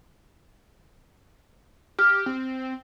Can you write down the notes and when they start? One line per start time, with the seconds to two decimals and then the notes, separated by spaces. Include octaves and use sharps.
1.99 G4 F6
2.26 C4